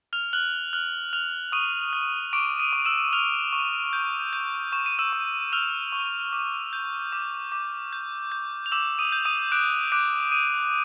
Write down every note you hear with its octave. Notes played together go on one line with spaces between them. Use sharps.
F6 F7
F6 F#6 F#7
F6 F#6 F#7
F6 F7
C#6 D#6 D#7
F6
C#6 D6 D7
D#6 D#7
C#6
E6 E7
E6 F6 F7
C#6
G6
G6
C#6 E7
D#7
E6 E7
C#6
E6 F6 F7
C#6
D6
G6
D6
D6
G6
G6
F7
D6 E6 E7
D#6 D#7
G6
D#6 D#7
D6 F#6 D7
D6 F#6 D7
D#6 D#7